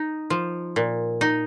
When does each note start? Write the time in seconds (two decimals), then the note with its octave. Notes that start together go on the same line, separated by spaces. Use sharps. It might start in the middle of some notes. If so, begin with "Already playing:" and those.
Already playing: D#4
0.30 F3
0.76 A#2
1.21 D#4